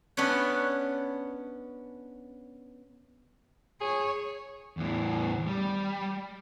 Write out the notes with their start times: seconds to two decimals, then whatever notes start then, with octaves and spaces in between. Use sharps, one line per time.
0.17 B3 C#4 D4 B4 C#5
3.81 G#4 C#5
4.77 E2 A2
5.47 G3